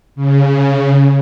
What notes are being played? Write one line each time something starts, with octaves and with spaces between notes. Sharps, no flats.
C#3